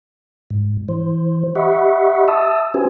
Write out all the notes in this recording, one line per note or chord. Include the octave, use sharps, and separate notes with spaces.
G#2
E3 C5
G4 D#5 E5 F#5 B5 C#6
E5 A5 D#6 E6
C#4 F#4 G4 B4 C5 G#5